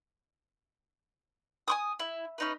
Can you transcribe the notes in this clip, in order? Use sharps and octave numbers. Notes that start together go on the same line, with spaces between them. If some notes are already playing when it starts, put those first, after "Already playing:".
G#5 C#6 D#6
E4
C#4 D#4 B4